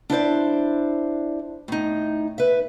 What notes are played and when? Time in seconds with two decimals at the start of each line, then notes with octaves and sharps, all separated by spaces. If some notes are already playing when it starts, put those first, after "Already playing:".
0.10 D4 E4 C5 D5
1.68 A2 D#4
2.38 B4 E5